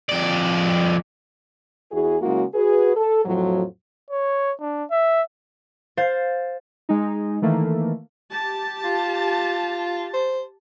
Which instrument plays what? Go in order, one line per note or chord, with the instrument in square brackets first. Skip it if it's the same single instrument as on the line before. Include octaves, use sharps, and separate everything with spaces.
[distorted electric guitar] F2 D5
[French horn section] E2 E3 F#4 G#4
C#3 F#3 G#3 A#3 E4 F#4
F#4 G#4 B4
A4
F2 A2 F3 F#3
[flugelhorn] C#5
D4
E5
[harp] C5 F5 G#6 A6
[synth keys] G#3 D#4
D#3 E3 A3 A#3
[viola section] G4 A5
[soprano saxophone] F4
C5